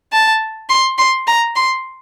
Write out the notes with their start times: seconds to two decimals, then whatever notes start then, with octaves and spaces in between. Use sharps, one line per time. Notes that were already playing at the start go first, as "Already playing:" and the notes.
0.12 A5
0.69 C6
0.98 C6
1.27 A#5
1.56 C6